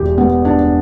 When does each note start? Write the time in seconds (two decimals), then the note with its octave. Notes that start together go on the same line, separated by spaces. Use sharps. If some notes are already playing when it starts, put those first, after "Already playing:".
Already playing: E1 E2 E3 G4
0.18 B3
0.45 D4